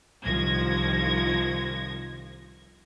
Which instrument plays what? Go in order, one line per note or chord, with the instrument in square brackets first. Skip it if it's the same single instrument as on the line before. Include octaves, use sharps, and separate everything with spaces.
[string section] C2 D#3 F3 G#6 A#6